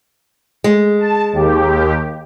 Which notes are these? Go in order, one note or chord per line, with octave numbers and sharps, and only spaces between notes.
G#3
A5
D#2 G4